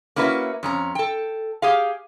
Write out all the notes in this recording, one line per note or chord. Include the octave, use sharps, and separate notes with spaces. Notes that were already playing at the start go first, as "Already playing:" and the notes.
A#3 C#4 E4 F#4 B4
F2 C#4 A#5
A4 G5
G4 G#4 F5